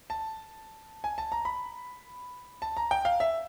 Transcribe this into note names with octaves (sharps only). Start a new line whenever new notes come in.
A5
G#5
A5
A#5
B5
A5
A#5
G5
F5
E5